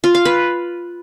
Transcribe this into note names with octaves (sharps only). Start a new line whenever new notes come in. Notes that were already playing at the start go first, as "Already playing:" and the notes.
F4
F5
B4